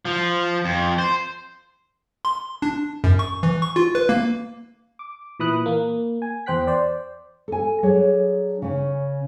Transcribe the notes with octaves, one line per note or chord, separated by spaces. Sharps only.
F3
F2
C5
C6
D4
F#2
C#6
E3
C#6
F4
B4
A#3
D6
A#2 E3 B5 D#6 F#6
A#3
G#5
E2 C5 G5 F#6 B6
C5 D5
A4 G#5
F#3 D4 G#4 C#5
C#3 C#4